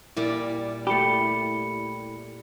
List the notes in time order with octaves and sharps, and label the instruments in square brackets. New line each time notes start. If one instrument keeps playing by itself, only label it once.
[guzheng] A#2 G3 [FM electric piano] E4
[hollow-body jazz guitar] A3 G4 [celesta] B5 C#7